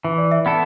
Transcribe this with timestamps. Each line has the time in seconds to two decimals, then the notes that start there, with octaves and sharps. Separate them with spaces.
0.04 E3 E5
0.18 D5
0.32 E5
0.46 B3 E4 A4